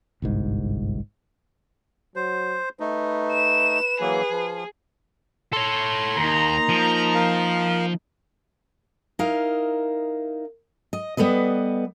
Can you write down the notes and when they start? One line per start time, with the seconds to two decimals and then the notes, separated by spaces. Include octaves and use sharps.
0.22 G1 C2 G#2
2.16 F#3 C5
2.80 A3 D#4 B4
3.31 E7
4.00 E3 F#3 A#3 G#4
4.31 F3
5.53 A4 C#5 C6
6.17 D#2 A#3 D#4 A#5
6.69 F3
7.15 A#4 F5
9.19 D#4 E4 A#4 F5
10.93 D#5
11.17 G3 B3 A4 B4 D#5